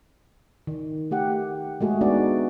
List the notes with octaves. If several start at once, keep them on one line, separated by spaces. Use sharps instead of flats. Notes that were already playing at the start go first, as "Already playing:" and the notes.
D#3
A3 G4 F#5
G#3 A3 F#4 G#4
B3 D4 D#4 F#4 D5